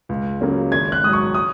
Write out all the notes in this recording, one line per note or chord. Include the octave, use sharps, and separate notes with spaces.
C#2
C#3 F#3 A#3 C#4
G#1 G#6
F#6
G#2 F#3 D#6
C#6
D#6